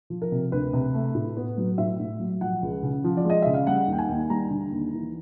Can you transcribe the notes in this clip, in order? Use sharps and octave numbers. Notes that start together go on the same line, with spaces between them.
F3
A#4
C3
D2 B4
C3
A3
A2
B3
F#3
A2 E5
A2
F#3
F3 F#5
C#2
C#3
F3
D5
G#3 D#5
C#3 E5
F5
G3 F#5
D#2 G5
G#5
D#2
G3 A#5
D3
D#2
E3